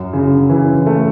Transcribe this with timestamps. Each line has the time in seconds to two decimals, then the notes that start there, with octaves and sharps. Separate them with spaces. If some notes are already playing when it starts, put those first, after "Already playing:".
Already playing: F#2
0.13 C#3
0.50 E3
0.87 A3